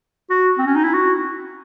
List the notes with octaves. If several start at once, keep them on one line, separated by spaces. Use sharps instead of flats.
F#4
C4
C#4
D#4
E4
F#4